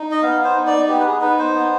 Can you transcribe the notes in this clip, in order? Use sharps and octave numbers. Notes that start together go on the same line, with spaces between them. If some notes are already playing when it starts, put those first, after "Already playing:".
Already playing: D#4
D#5
B3 F5
C5
D#4
D5
B3 G4
B4
G#4
D#4 B4
C5
B3